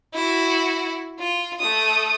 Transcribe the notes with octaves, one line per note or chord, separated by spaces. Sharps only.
E4 F#4
F4
A3 D#6